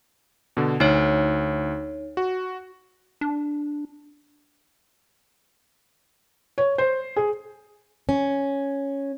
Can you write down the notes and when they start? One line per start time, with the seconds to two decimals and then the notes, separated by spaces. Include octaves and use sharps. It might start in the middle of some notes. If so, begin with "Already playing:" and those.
0.57 B2 D3
0.80 D2 D#4 C#5
2.17 F#4
3.21 D4
6.58 C#5
6.78 C5
7.16 G#4
8.09 C#4